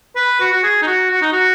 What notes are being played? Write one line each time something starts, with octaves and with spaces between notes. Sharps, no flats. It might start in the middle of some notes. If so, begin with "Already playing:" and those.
B4
F#4
F#4
G#4
D#4
F#4
F#4
D#4
F#4